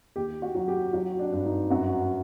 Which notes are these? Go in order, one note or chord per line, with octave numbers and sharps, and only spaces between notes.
D#2 G4
F#4
F#3
G4
F#3 F#4
D4
G2
D#4
F#2 F#4